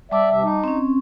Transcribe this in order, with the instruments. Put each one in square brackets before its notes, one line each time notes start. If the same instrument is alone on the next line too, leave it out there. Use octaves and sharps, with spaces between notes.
[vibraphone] G3 A5 D6 [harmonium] D5 E5
[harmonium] C3 E5
D#4
[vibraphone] C4 C#4